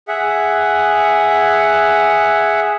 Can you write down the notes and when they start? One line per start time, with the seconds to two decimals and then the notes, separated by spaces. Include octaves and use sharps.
0.08 G#4 E5 F#5